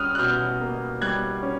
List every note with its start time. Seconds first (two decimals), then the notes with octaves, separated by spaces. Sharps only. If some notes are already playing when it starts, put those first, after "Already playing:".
Already playing: G3 C#4 D#6 F6 F#6
0.15 F#6
0.19 B2 F6 G6
0.61 A#3
1.02 G3 F#6 G#6
1.43 C#4